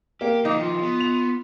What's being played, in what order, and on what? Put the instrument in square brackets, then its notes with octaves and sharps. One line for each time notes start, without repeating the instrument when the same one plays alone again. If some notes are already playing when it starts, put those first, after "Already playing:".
[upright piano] A#3 [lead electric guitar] G4
[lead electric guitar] D#3 F3 [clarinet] A#3 [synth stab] D#4 [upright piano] D#5
[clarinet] F4
[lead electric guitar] B3
[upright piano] F7